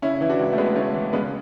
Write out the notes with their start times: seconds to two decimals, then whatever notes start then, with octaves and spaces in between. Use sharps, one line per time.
0.02 C#3 C#4 E4
0.21 E3 E4
0.30 D4 F#4
0.39 C#2
0.53 A3
0.58 C#2 G#3 B3
0.75 C#3 A3 C#4
0.94 E3
1.13 C#3 G#3 B3